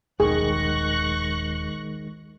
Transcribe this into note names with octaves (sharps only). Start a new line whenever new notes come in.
D#1 B1 D#3 G#3 G#4 C#6 F#6 A#6